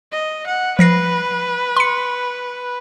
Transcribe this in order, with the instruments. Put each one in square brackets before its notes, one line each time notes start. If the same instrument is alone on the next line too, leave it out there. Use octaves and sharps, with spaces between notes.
[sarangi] D#5
F#5
[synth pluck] F3 A#6 C7 [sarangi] B4
[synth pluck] C6 C#7